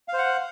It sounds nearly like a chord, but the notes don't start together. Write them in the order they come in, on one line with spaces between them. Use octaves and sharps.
F5 C5 F#5